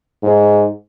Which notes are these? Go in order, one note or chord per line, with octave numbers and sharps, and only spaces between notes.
G#2